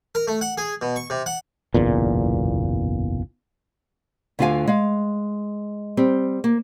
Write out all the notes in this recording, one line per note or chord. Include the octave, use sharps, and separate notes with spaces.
A#4
A3
F#5
G#4
B2
C#6
C3
F#5
F#1 B1 E2 A#2
D2 D3 F4 A#4 F5 G#5
G#3 F5
G3 C4
A#3